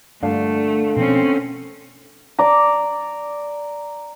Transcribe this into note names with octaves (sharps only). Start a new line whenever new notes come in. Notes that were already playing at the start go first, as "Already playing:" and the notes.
G2 A#2 D3 A3 F5
B2 F3 A#3 C4 C#4
D5 A#5